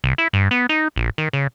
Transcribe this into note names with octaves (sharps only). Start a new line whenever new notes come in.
C2
E4
G2
B3
D#4
A#1
D#3
C#3